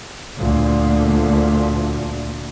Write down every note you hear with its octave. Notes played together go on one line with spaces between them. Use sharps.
D2 A#2